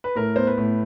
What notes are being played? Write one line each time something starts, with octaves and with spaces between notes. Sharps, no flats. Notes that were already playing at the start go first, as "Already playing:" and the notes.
B4
A2 A#4
B3 C5
B4
A2